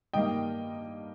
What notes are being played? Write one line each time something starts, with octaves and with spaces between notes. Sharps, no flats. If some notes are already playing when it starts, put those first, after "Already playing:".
G2 D#3 G3 A#3 D#5 G5